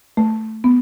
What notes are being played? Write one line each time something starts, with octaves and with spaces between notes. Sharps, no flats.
A3
B3